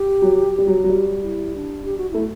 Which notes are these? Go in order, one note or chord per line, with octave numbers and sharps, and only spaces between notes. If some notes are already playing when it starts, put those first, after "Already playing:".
Already playing: G4
F#3
G3
F#3
F#3
G3 F#4
E4
D4
G4
F#4
A3 E4